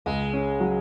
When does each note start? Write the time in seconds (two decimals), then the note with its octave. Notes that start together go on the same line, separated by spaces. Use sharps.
0.06 C#2 G#3
0.33 C#4
0.60 F#3